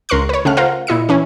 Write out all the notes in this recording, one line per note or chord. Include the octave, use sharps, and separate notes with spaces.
C#2 A#4 C6 C#6 F#6
B4 C#5
C#3 A3 F#5 F6
F4 A#4 C5 F5 F#5
A#2 E4 D#5 C#7
E3 C#4